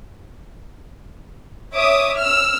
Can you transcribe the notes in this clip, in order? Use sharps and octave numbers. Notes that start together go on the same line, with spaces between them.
C#5 E5 D6 D#6
E6 F6